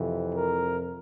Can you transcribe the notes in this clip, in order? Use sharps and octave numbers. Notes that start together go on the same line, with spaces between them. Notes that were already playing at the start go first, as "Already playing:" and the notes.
Already playing: F2 C3 E3
A#4